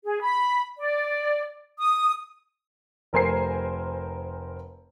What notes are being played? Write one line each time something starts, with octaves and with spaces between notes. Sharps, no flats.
G#4
B5
D5
D#6
F1 A#4 C5 G#5 C7